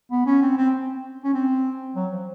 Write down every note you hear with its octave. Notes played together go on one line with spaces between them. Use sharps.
B3
C#4
C4
C4
C#4
C4
F#3
F3